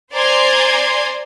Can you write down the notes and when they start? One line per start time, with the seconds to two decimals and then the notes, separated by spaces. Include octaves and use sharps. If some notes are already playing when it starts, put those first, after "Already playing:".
0.13 C5 D5 G#5 A#5 C6 G#6